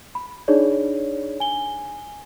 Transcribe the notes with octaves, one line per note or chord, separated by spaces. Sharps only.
B5
D4 D#4 G#4 C#5 D5
G#5 G7